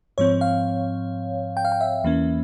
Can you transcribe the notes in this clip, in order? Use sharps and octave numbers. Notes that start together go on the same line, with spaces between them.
G#2 F3 C4 C#5
F5
G5
F5
G5
E5
E2 E3 A#3 C#4